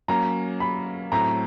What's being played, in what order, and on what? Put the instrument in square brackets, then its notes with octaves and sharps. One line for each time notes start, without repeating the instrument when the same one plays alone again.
[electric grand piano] F#3 A#3 C#4 [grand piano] A#5
[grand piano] B5
[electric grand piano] A2 F#3 A3 C4 [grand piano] A#5